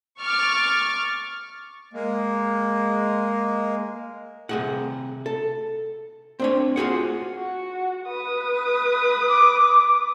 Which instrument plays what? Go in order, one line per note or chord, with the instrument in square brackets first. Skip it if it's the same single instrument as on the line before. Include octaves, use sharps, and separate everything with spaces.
[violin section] C#6 D6 F6 A6
[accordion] G#3 A#3
[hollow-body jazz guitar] C3 G#4 F#5
A4
C4 D4 C#5
F4 F#4 G#4 F#5
[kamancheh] F#4
B4 D#6
[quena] D6